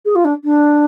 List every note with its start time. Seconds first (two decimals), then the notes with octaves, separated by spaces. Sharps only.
0.05 G#4
0.15 F4
0.25 D4
0.44 D4